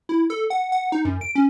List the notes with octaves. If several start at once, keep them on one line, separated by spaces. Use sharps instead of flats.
E4
A4
F#5
F#5
D#4
F#2
D7
C#4